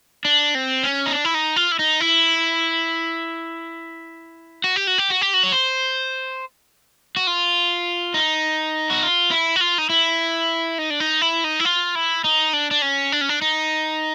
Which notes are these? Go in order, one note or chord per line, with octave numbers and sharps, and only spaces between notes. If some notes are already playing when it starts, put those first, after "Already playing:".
D4
C4
C#4
D#4
D4
E4
D#4
F4
E4
D#4
E4
F#4
G4
F#4
G4
F#4
G4
F#4
C#5
C5
F#4
F4
D#4
F#4
F4
E4
F#4
F4
D#4
E4
D#4
D4
D#4
E4
D#4
E4
F4
E4
D#4
D4
D4
C#4
D4
C#4
D4
D#4